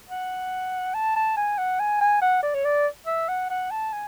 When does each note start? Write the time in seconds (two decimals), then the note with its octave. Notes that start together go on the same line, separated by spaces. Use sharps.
0.09 F#5
0.94 A5
1.16 A5
1.37 G#5
1.58 F#5
1.80 G#5
2.01 G#5
2.21 F#5
2.43 D5
2.54 C#5
2.65 D5
3.07 E5
3.29 F#5
3.50 F#5
3.71 A5
3.93 G#5